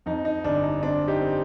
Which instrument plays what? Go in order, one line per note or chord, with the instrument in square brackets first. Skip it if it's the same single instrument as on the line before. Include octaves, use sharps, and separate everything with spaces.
[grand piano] F2 D#4
D#4
G1 D4
D#4
C4 D4
D#4 G4
C4